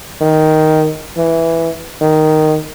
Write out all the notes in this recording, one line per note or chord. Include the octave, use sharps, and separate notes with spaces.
D#3
E3
D#3